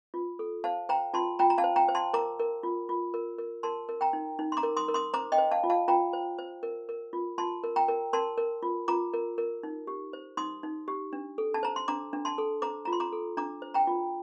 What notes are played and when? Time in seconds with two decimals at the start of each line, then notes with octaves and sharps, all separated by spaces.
0.14 F4
0.39 A4
0.64 C5 F5 A5
0.89 C5 G5 A#5
1.14 F4 A5 C6
1.39 F4 G5 A#5
1.50 A#5
1.58 F5 A5
1.64 C5
1.76 G5 A#5
1.88 C5
1.95 A5 C6
2.13 A#4 A#5 D6
2.39 A#4
2.63 F4
2.89 F4
3.14 A#4
3.38 A#4
3.63 A#4 A5 C6
3.89 A#4
4.01 G5 A#5
4.13 D#4
4.39 D#4
4.52 C6
4.57 A#5 D6
4.63 A#4
4.77 C6 D#6
4.88 A#4
4.94 C6 D#6
5.14 C5 A#5 D6
5.32 D#5 G5
5.38 C5
5.51 F5 A5
5.64 F4
5.70 F5 A5
5.88 F4 G5 A#5
6.13 C5
6.39 C5
6.63 A#4
6.89 A#4
7.13 F4
7.38 F4 A5 C6
7.64 A#4
7.76 G5 A#5
7.88 A#4
8.13 A#4 A5 C6
8.38 A#4
8.63 F4
8.88 F4 A#5 D6
9.14 A#4
9.38 A#4
9.63 D#4
9.87 G4
10.13 C5
10.37 D#4 C6 D#6
10.63 D#4
10.88 G4
11.13 D4
11.38 A4
11.54 A5
11.63 C5 A#5
11.76 C6
11.88 D4 A#5 D6
12.13 D4
12.25 A5 C6
12.38 A4
12.62 C5 A#5 D6
12.85 F4 A#5
12.93 C6
13.00 A#5 D6
13.12 A4
13.37 D4 A#5 D6
13.62 C5
13.74 G5 A#5
13.87 F4